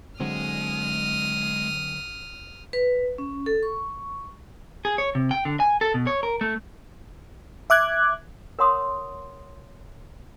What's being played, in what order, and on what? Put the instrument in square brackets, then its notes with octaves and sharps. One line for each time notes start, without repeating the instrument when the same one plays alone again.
[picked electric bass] D3 F#3 C4 [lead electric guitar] G#3 [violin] D#6 F6
[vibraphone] B4
C#4
A4
C#6
[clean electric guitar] G#4
C#5
C3
G5
D3
G#5
A4
B2
C#5
A#4
A3
[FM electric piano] E5 D6 F#6 G#6
[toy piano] A#4 C#5 F#5 C6 D#6